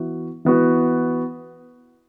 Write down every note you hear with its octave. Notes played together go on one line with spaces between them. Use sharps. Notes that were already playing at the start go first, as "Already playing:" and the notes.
Already playing: E3 B3 F#4
E3 B3 F#4